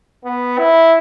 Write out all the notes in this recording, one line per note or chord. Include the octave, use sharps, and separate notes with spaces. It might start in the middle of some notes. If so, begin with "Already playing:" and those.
B3
E4